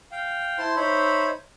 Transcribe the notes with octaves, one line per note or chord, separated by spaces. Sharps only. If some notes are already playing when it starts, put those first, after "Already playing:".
F5 G5
E4 C5 A5 C6
D#4 C5 C#5 E5 B5